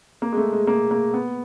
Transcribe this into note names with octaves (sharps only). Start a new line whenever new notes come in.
A#3
G#3
A3
G#3
A#3
A#3
B3